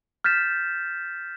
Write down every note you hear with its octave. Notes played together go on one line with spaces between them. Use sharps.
F6 G6 A6 B6 E7